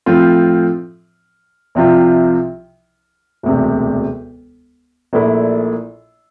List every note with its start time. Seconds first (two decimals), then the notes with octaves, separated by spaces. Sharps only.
0.06 A2 F3 C4 F4
1.75 C2 C3 F3 C4 F4
3.43 E1 D2 C3
5.13 A#1 A#2 A3 E4